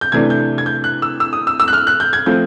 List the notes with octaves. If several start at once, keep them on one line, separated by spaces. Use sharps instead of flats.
G6
C3 E3 A3 D4 G#6
G6
G#6
G6
F#6
E6
E6
D#6
E6
E6
F#6
F6
F#6
G6
G#6
F3 A3 C4 G6